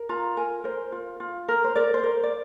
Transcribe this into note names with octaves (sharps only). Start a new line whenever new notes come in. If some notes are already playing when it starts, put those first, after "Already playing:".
Already playing: A#4
F4 A#5
A#4 G#5
A#4 C5
F4
F4
A#4
C5
A#4 D5
C5
A#4
D5